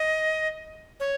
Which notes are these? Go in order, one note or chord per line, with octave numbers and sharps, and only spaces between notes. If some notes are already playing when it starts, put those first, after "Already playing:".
Already playing: D#5
C#5